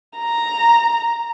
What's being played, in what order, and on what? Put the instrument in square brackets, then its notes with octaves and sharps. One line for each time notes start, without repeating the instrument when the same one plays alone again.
[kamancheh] A#5